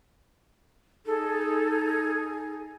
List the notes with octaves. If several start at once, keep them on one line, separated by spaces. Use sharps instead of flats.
D#4 G#4 A4